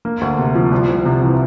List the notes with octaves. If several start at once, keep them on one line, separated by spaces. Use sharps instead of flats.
A#3
D2
C3
F3
C2
C2
C3
E3